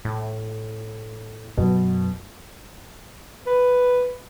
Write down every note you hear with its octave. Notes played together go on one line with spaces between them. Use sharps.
A2
F#2 B2
B4